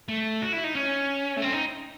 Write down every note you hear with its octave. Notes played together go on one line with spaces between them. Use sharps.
A3
F#4
E4
D#4
C#4
A3
C4
D#4